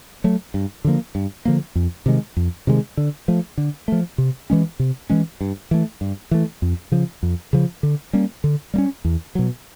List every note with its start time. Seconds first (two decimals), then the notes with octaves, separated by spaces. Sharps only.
0.24 F#3 A3
0.54 G2
0.84 D3 F3 A#3
1.15 G2
1.45 D3 F3 A#3
1.75 F2
2.06 C3 D#3 G#3
2.37 F2
2.67 C3 D#3 G#3
2.97 D3
3.28 F3 A3
3.57 D3
3.88 F3 A3
4.18 C3
4.50 E3 G#3 C#4
4.79 C3
5.10 E3 G#3 C#4
5.41 G2
5.71 E3 A3
6.01 G2
6.31 E3 A3
6.62 F2
6.92 C#3 F3
7.23 F2
7.53 C#3 F3
7.83 D3
8.13 G3 A#3 C#4
8.44 D3
8.74 G3 A#3
8.78 C#4
9.05 E2
9.35 B2 F#3